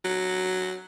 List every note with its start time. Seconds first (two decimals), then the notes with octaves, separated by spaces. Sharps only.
0.04 F#3